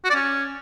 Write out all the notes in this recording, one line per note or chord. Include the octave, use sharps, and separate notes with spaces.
F#4
D5
C#4